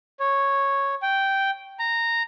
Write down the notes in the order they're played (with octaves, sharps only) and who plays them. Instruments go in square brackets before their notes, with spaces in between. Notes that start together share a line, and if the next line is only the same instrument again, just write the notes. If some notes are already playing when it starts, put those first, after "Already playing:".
[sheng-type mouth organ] C#5
G5
A#5